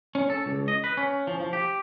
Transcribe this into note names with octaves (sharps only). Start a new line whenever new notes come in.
C#4
A4
C#2
D#5
B4
C#4
F3
F3
G4